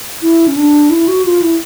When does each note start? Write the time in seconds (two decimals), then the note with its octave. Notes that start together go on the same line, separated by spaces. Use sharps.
0.22 E4
0.48 C#4
0.57 D4
0.90 E4
1.08 F#4
1.25 F4
1.42 E4